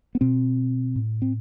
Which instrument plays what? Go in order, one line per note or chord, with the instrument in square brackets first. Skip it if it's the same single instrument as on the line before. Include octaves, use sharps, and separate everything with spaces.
[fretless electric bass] B3
B2 C4
A2
C4